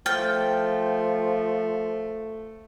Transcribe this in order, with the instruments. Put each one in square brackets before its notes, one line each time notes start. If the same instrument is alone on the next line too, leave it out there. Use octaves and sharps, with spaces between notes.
[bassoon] F3 [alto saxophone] A3 [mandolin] G5 [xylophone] F6 A6